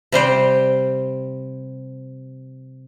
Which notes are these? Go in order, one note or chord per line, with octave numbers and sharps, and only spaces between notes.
C3 G3 C5 G5